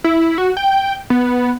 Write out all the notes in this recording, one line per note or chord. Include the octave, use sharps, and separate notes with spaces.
E4
F#4
G5
B3